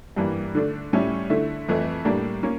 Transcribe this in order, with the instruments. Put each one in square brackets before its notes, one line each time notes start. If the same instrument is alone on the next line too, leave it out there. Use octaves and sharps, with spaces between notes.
[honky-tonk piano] G2 E3 G3 A#3
D3 A3 D4
A2 G3 C#4 E4
D3 A3 E4
F2 E3 A3 E4
A2 G3 A#3 D4
A#3 C#4